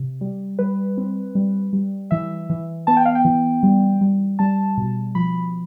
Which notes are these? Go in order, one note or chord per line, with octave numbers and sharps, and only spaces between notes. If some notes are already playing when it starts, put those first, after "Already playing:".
Already playing: C3
G3
G3 B4
C4
G3
G3
E3 E5
E3
B3 A5
G5
F5
G5
E3
G3
G3
G3 A5
B2
F3 B5